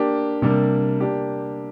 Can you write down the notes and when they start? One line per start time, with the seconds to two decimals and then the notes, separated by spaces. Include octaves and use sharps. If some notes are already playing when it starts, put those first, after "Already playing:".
Already playing: A#3 D4 G4
0.42 C3 G3 A#3 D4
1.00 A#3 D4 G4